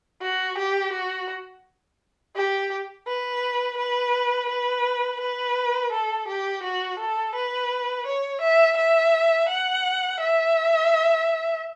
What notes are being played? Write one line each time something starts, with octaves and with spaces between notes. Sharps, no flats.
F#4
G4
F#4
G4
B4
B4
B4
B4
A4
G4
F#4
A4
B4
C#5
E5
E5
F#5
E5